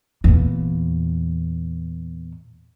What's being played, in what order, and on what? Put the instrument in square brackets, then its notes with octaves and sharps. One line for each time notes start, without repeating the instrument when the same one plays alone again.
[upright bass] E2 A#2